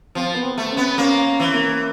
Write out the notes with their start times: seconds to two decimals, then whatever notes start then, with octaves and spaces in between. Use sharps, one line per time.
0.15 F3 C4
0.34 B3
0.43 C4
0.58 A3
0.71 C#4
0.77 B3
0.98 A#3 C#4
1.40 E3
1.54 A#3